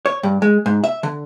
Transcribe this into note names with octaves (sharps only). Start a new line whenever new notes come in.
C#5
G2
G#3
G#2
E5
D3